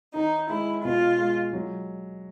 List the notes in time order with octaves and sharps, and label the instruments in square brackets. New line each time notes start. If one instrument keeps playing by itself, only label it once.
[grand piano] D#3 [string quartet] D#4
[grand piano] G#3 [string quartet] E4
[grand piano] B2 [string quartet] F4
[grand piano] G#3
F#3